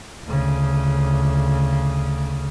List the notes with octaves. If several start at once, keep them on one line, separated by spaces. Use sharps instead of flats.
D2 C#3